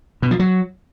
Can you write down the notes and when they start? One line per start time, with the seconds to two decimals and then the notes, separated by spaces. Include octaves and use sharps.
0.22 B2
0.31 F3
0.39 F#3